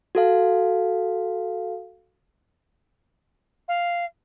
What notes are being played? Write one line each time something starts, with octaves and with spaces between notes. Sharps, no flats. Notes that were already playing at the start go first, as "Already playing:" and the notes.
F#4 A4 F5
F5